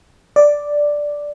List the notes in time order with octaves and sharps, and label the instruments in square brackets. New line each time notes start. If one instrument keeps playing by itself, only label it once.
[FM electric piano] D5